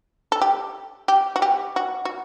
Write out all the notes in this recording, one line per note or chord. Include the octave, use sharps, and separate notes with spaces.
A4
G4
G4
F#4
G4
F#4
F#4